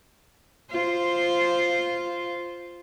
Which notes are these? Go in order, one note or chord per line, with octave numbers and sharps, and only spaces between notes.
F4 C5